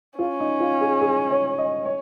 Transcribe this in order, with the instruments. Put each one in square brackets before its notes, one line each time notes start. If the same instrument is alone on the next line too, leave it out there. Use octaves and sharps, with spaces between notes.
[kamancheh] C#4 [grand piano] F4
[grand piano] D#4
F4
G#4
G#4
C#5
D#5
C#5